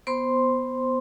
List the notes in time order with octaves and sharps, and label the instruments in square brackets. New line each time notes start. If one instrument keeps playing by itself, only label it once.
[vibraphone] B3 C5 C6